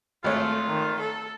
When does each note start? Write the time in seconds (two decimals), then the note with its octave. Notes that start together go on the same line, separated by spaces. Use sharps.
0.24 G#1 A3 F4 C#5
0.69 D#3
1.00 A4